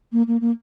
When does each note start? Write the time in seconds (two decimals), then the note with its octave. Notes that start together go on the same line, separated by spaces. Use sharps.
0.12 A#3
0.28 A#3
0.41 A#3